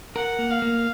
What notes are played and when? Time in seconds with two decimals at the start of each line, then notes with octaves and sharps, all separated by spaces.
0.16 A#4 F#5
0.39 A#3
0.50 F5
0.62 A#3